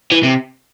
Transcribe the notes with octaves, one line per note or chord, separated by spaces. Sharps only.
E3
C3